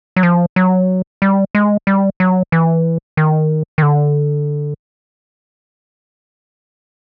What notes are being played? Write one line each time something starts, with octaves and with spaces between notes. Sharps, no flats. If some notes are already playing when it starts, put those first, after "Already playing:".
F#3
F3
F#3
G3
G#3
G3
F#3
E3
D#3
D#3
D3